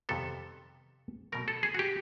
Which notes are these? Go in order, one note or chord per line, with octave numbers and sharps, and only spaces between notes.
F2 C3 D#3 G3 B3 A4
B2 F#3 A3 A#4
A4
G#4
F#4
G4